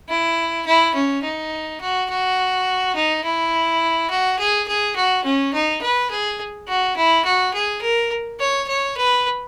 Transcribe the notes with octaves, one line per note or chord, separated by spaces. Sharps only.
E4
E4
C#4
D#4
F#4
F#4
D#4
E4
F#4
G#4
G#4
F#4
C#4
D#4
B4
G#4
F#4
E4
F#4
G#4
A#4
C#5
C#5
B4